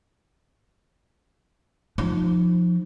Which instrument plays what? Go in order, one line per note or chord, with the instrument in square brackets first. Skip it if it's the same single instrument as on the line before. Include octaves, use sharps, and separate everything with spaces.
[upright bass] F3 D#4